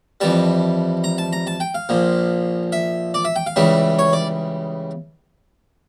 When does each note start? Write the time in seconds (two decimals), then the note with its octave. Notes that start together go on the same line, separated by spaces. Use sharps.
0.21 F2 E3 G3 A5
1.04 A#5
1.18 A5
1.33 A#5
1.47 A5
1.60 G5
1.75 F5
1.89 A#1 A#2 F3
2.72 E5
3.14 D5
3.25 E5
3.36 G5
3.47 F5
3.56 C#2 C#3 E3 G3 E5
3.99 C#5
4.13 D5